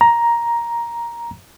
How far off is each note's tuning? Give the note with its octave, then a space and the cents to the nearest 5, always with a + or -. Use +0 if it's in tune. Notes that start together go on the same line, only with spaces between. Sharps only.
A#5 +10